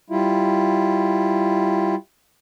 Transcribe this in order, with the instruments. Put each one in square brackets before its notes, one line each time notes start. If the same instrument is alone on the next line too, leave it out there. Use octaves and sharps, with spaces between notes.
[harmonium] G3 E4 F4